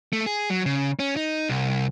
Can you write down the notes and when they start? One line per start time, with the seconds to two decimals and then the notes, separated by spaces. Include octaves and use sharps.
0.13 A3
0.26 G#4
0.50 F#3
0.66 C#3
0.99 C#4
1.16 D#4
1.50 C2